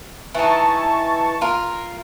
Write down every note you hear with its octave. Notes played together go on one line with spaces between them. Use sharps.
E3 D#4 A5 C#6
F4 A#4